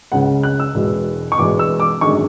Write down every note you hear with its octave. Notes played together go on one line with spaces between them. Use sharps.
C#2 C#3 G#3 F#5
F#6
E6
E1 E2 B2 G#3
C#6
E1 E2 B2 G#3 D6
E6
D6
G#1 F#2 D3 G#3 C#6